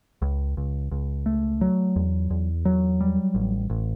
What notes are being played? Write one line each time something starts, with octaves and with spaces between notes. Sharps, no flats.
C#2
C#2
C#2
A3
F#3
E2
E2
F#3
G3
A1
A1